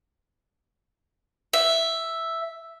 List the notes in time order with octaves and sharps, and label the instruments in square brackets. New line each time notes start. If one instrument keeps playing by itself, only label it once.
[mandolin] E5